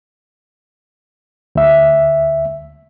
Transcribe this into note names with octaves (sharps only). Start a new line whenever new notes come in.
D2 E5